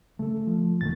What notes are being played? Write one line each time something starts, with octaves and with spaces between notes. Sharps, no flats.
C#3 A3 A4
F3
E1 D3 D#3 A3 A6